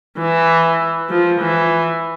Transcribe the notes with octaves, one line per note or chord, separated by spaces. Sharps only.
E3
F3
E3